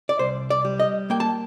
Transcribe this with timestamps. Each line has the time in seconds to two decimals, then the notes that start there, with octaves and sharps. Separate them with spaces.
0.09 D5
0.19 C2 C5
0.50 D5
0.65 G3
0.80 D#5
1.10 A#3 G5
1.20 A5